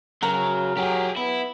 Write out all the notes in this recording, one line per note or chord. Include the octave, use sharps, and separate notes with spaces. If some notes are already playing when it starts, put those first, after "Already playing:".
C#3 F#3 A#4
F#3 G4 G#4
B3 E4